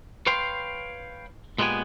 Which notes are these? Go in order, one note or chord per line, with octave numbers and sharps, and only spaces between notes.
B4 C#5 F5 G5 C6
A#2 G#3 A3 B3 G4 G#5